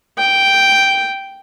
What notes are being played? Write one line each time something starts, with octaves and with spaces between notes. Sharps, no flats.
G5